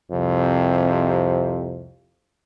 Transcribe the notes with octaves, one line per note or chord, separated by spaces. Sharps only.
C2 F2 C3